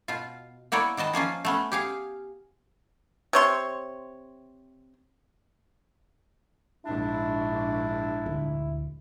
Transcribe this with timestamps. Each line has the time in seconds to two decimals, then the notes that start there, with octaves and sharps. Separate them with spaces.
0.08 B2 F4
0.72 A#3 B3 E4 C#5 D5
0.97 D#3 B3 D#5 A5
1.13 F3 A#3 C#4 F4
1.45 A3 B3 C#4
1.72 G4 G#4 F5
3.33 C3 C#5 C6
6.86 A#1 G#2 D4 E4
8.26 D2